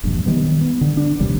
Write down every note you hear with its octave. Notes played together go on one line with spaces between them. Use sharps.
E1 A#1 G2
D#3 G3 B3
B3
D3
D4
A#1 D#2 C3 G3